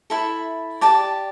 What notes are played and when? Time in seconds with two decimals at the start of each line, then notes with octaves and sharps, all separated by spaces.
0.10 E4 A4 E5 B5
0.81 G4 D5 A5 D6